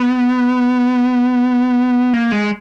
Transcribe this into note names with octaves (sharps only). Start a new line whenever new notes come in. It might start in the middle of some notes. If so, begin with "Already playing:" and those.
Already playing: B3
A#3
G#3